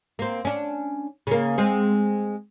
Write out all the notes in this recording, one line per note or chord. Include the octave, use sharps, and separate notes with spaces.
A#3 C4
C#4 D4
C#3 A#3
G#3 C4 G#4